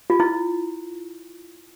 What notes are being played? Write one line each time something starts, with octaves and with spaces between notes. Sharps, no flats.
F4
E4